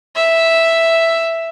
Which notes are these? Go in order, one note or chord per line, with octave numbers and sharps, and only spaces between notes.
E5